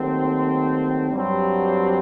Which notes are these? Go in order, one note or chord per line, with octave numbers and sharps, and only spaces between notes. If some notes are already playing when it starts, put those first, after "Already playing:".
Already playing: D#2 D#3 F#3 A3 C4
G2 F#3 C4